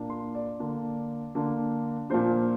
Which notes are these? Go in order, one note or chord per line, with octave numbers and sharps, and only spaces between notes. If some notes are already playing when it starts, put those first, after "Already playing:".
Already playing: A#2 A#3 D4
C6
D5
D3 A#3 D4
D3 A#3 D4
A#2 F3 A#3 D4 C5